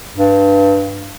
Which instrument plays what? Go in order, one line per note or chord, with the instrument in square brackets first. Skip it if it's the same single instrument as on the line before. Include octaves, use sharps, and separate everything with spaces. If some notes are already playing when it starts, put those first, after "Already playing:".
[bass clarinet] G2